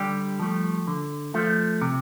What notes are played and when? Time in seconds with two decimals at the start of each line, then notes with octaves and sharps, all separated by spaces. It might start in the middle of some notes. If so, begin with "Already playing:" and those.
Already playing: D3 G3 G4
0.39 F3 A3
0.88 D3
1.34 F3 A3
1.81 C3